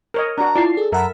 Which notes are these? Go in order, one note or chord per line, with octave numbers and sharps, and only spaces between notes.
A#4 C#5 D#5
D4 F#4 A#5
E4 F4 D5 A5 C7
G#4 A4
F#2 A4 A#4 E5 F#5 A#5 B5